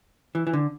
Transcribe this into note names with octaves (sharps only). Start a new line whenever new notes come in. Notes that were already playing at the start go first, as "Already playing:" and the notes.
E3
E3
D3